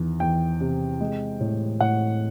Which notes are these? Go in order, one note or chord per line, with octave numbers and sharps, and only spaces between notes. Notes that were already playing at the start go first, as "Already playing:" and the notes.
Already playing: E2 D#3
E2 G5
C3
G#3
A2
A2 F#5